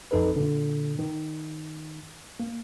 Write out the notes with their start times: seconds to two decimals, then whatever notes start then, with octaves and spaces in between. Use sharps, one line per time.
0.11 A1 F2 D#4 A4 B4
0.36 A#2 D3
0.99 D#3
2.40 A#3